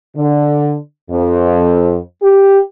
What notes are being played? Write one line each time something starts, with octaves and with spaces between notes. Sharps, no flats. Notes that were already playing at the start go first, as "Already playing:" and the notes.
D3
F2
G4